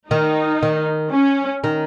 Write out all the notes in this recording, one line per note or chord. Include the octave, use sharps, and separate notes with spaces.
D#3 D#4
D#3
C#4
D#3